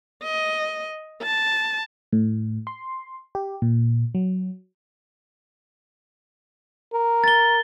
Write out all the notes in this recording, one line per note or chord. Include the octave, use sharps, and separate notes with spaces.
D#5
A5
A2
C6
G4
A#2
F#3
A#4
A6 G7